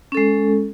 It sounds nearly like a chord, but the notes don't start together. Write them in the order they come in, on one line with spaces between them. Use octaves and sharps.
C#4 A4 G#3